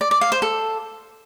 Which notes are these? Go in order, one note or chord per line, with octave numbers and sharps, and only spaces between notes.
D5
D5
F5
C5
A4